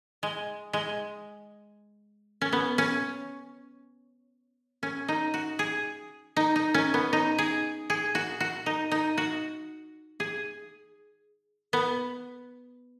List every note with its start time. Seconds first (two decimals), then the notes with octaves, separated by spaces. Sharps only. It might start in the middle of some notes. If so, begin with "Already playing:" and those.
0.23 G#3
0.73 G#3
2.41 C#4
2.52 B3
2.78 C#4
4.83 C#4
5.08 D#4
5.34 F#4
5.59 G#4
6.36 D#4
6.56 D#4
6.74 C#4
6.94 B3
7.13 D#4
7.38 G#4
7.90 G#4
8.15 F#4
8.40 F#4
8.66 D#4
8.91 D#4
9.18 F#4
10.20 G#4
11.73 B3